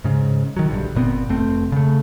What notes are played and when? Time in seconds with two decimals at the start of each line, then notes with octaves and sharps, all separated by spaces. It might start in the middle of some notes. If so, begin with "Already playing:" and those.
0.04 G#2 C#3
0.57 D#3 F#3
0.69 A#1 G2 D3
0.95 G1 A#2 B3 C4
1.29 F1 A3 C4
1.72 C#3 A3